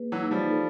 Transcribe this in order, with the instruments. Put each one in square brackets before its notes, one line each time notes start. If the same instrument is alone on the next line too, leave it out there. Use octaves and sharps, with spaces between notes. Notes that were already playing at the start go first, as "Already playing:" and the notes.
Already playing: [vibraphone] A#3 G#4 B4
[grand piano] E3 F#3
[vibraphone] D#4
[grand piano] F3 G3
[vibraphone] A4